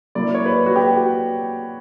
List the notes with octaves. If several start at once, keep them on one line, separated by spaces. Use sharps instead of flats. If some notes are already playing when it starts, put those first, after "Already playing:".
F#3 A#3 E4 D5
C#5
B4
F#4
G4